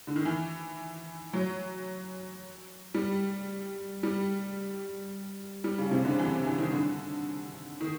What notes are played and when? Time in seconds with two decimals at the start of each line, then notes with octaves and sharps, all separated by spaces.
0.07 D3
0.16 D#3
0.25 E3
1.33 F#3
2.94 G3
4.03 G3
5.64 G3
5.78 C#3
5.91 C3
6.05 D3
6.19 E3
6.46 E3
6.58 D#3
6.73 D3
7.81 D#3